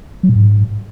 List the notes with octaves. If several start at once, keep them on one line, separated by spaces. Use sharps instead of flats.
F#3
A#2
G#2